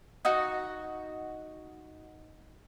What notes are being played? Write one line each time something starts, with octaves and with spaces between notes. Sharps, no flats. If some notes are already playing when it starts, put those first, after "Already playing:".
D#4 F#4